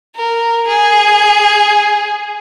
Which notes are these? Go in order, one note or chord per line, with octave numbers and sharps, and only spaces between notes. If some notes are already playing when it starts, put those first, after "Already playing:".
A#4
G#4